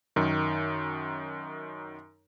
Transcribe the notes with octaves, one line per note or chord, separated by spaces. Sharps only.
F#2 D#3